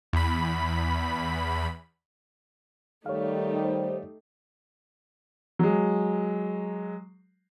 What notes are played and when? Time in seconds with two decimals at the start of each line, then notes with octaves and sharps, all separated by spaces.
0.13 E2 B5
3.06 D#3 G3 A3 D#4 G4 C#5 F5
3.62 C5
5.59 F#3 G#3